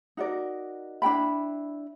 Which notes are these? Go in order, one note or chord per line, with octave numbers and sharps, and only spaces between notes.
D#4 F#4 A#4 D5
D4 E4 G5 B5